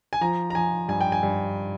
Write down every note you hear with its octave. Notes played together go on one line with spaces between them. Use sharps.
G#5
F3 A#5
A#5
F3 G#5
G2 G#5
G5
G#5
G2